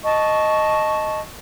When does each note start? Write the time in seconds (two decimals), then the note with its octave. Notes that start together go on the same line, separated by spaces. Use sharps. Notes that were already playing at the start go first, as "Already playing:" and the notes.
0.04 D#5 A5 C#6